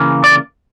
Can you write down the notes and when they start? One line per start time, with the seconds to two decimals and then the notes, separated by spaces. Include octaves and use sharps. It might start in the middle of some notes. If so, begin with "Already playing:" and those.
Already playing: C#3 E3 A#3
0.24 D5